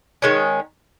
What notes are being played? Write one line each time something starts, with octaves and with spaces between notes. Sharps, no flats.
D#3 G#3 C#4